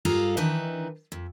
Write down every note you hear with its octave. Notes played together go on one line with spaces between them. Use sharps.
G2 F4 G#4 A4 F5 A#5
D#3 E3 D4 D#4 B4
F2